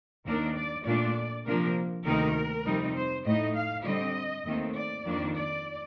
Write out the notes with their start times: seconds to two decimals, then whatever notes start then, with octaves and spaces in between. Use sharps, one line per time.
0.25 D#2 D#3 A#3 D4 A#4
0.56 D5
0.85 A#2 A3 D4 D5
1.45 C3 F3 A#3 D4 A#4
2.05 D2 C3 D#3 A#3 D#4 A#4
2.65 F2 C3 G3 C4 D#4
2.95 C5
3.25 A2 A3 D#4 D#5
3.55 F5
3.85 D3 G3 C4 D#5
4.45 D#2 D#3 A3 C4
4.74 D5
5.05 F2 D#3 A#3 D4
5.35 D5